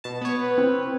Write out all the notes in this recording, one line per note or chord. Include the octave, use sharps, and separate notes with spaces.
B2 A5
B3 C#5
B4
C4